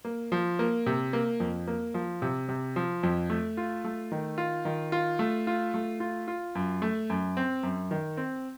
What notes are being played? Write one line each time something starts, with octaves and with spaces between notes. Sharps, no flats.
A#3
F3
A#3
C3
A#3
F2
A#3
F3
C3
C3
F3
F2
A3
F4
A3
D#3
F4
D#3
F4
A3
F4
A3
F4
F4
F#2
A3
F#2
C4
F#2
D#3
C4